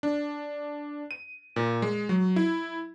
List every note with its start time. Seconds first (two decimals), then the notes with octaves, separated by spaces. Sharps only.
0.03 D4
1.11 D#7
1.56 A#2
1.82 G#3
2.09 F#3
2.36 E4